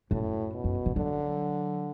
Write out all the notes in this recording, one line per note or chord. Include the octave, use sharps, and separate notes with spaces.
F#2 A2
B2
F#2
E3
D3 F#3